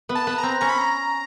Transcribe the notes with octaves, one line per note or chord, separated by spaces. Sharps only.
B3
A5
B3
A#5
C4
C#4 A#5
B5
A#5